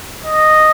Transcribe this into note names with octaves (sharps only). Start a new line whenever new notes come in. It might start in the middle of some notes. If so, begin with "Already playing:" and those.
D#5